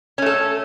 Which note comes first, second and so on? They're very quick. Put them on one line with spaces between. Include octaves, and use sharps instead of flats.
C#4 A3 A4